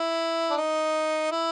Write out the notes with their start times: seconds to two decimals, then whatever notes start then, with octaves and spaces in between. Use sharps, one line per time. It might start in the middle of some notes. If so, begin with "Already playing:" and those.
Already playing: E4
0.50 D4
0.57 D#4
1.31 E4